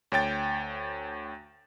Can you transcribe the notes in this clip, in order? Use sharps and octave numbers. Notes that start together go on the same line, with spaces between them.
D2 C#5 G5 A6